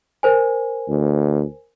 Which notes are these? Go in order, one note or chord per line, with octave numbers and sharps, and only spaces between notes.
A#4 C5 G#5
D2